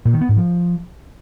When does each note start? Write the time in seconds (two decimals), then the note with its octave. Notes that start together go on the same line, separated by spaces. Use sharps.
0.05 A#2
0.13 D#3
0.21 B3
0.29 G#2
0.37 F3